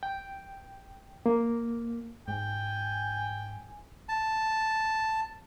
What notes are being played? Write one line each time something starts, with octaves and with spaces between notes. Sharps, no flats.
G5
A#3
G#2 G5 G#5
A5